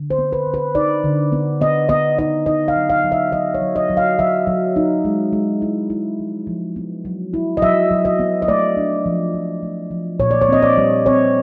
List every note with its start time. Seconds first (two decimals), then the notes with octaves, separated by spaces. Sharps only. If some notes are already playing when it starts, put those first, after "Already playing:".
Already playing: D3
0.10 C5
0.18 B3
0.33 B4
0.47 D3
0.54 B4
0.75 D#4 D5
1.04 D3
1.32 B3
1.61 B3 D#5
1.89 B3 D#5
2.18 D#4 D#5
2.46 D#4 D#5
2.68 F5
2.76 F#3
2.90 F5
3.04 F#3
3.12 E5
3.32 F#3 D#5
3.54 C#5
3.61 F#3
3.76 D#5
3.90 F#3
3.97 F5
4.19 F#3 E5
4.47 F#3
4.76 D#4
5.05 G#3
5.33 G#3
5.62 E4
5.90 E4
6.19 F3
6.47 F3
6.76 B3
7.05 F#3
7.34 E4
7.57 D#5
7.62 F#3 E5
7.91 F#3
8.05 D#5
8.19 B3
8.42 D#5
8.48 A3 D5
8.77 D4
9.06 F3
9.34 F3
9.63 A3
9.91 F3
10.19 A#2 C#5
10.31 D5
10.42 C#5
10.49 C4 D#5
10.62 D5
10.77 G3
11.06 C4 C#5